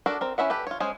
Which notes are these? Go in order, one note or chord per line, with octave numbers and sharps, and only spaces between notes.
D4 F#4 A4 A#4
C4 A#4
C#4 E4 E5 F#5
G4 A4 B4
F4 C#5
G#3 C#4 G#4 C5